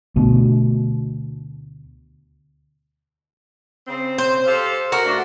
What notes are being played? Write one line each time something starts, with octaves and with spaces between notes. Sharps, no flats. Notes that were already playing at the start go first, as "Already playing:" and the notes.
D2 B2
C#3 C4
C5
G4 A4 F5
F#4 A#4
A3 D4